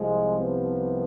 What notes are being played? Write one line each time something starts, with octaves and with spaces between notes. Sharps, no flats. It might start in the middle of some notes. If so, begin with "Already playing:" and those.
Already playing: C2 C3 F3 G#3
B3